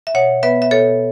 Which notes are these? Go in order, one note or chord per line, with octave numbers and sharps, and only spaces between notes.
E5
B2 C#5 F#5
B3 B4 E5
E5
B2 A4 C#5